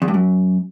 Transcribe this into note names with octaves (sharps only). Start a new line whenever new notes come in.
E2
G2
F#2